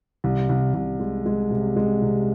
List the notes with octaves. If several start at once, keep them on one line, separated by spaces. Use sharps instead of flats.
C2
C2
C2
G#3
G#3
C3
G#3
C3